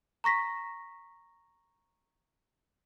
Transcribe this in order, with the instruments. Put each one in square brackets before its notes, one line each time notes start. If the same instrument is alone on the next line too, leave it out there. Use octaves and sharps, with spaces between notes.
[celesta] A#5 C#6 A#6 B6